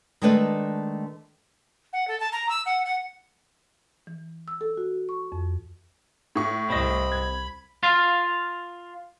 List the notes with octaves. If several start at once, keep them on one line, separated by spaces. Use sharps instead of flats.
D#3 G#3 A3 D4 B4
F#5
A4
A5
A#5
E6
F#5
F#5
E3
E6
A4
F#4
C#6
F2
A2 C#6
C2 C4 D#5 B5
G#6
F4 F5